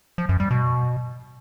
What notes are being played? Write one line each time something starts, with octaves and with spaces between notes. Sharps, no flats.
F3
F#2
G3
B2